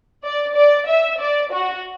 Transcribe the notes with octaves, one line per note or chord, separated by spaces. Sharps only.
D5
D5
E5
D5
F#4